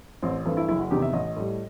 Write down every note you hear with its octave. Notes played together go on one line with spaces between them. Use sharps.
A1 C4
G2 E3 A3 C4
E4
F#1 E4
F#4
E2 C3 D#3 G4
E5
A1 D#5
A2 G3